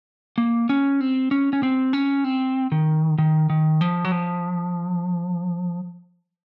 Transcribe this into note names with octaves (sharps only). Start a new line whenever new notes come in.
A#3
C#4
C4
C#4
C#4
C4
C#4
C4
D#3
D#3
D#3
F3
F#3
F3